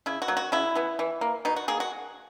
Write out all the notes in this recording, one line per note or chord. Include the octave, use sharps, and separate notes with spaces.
C#3 E4
F#4
F#3 A#3
F#4
C#3 E4
E3 B3
E3
A#3
B2 D#4
F#4
A#3 G#4
F#4